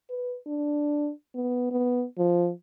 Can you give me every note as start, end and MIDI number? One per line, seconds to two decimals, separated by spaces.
0.10 0.37 71
0.47 1.11 62
1.35 1.68 59
1.72 2.04 59
2.18 2.51 53